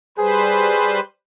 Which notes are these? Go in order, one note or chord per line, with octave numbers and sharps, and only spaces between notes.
G3 G#4 B4 C5